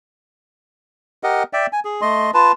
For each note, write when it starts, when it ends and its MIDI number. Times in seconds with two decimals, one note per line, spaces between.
1.23 1.43 67
1.23 1.43 70
1.23 1.43 75
1.23 1.43 78
1.53 1.67 74
1.53 1.67 76
1.53 1.67 79
1.73 1.80 80
1.85 2.01 68
2.01 2.31 57
2.01 2.31 75
2.01 2.31 84
2.34 2.52 65
2.34 2.52 71
2.34 2.52 81